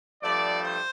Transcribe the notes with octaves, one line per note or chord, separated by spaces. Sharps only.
G2 F3 A3 D5
C5